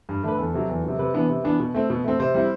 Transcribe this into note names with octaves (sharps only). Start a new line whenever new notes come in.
G2
D3 A3 D4 B4
E2 A4
C3 F#3
E2
C3 F#3
C3 B4
E3 B3 D4
C3
E3 B3 D4
B2
A3 C4
B2
A3 C4
C3 C5
G3 C4 E4